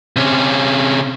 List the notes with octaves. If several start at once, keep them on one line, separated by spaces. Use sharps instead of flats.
C3 C#4